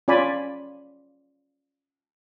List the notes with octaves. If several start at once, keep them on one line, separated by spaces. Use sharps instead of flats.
C#4 F4 D5 G#5 B5